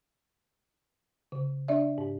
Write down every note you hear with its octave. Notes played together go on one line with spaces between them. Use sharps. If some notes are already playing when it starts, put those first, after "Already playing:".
C#3
D4 D5 E5
G#2